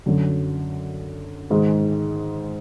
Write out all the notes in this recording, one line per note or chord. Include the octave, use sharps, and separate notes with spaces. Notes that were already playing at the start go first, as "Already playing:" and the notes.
F#2 D3 F#3
G#2 D#3 G#3